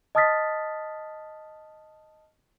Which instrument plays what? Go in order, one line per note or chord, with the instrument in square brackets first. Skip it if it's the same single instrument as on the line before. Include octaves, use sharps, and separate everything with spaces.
[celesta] D#5 A5 D#6 F6 A6 B6